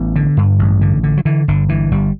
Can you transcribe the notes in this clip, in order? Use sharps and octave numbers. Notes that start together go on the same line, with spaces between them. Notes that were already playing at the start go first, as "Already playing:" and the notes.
Already playing: A1 B3
D3
G2
A1
D3
D3
F#3
D3 E3
G1 D3
G2 E3
G1 G3